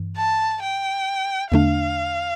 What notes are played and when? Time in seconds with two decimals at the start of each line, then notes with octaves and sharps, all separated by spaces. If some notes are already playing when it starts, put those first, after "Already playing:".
Already playing: G2 E3
0.17 A5
0.63 G5
1.52 E2 D3 A3 D4 F5